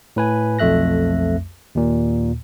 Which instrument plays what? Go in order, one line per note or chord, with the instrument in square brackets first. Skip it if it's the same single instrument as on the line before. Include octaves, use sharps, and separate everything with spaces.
[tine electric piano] A2 B4 G#5
B1 F2 A3 E5 F#6 A#6
D#2 A#2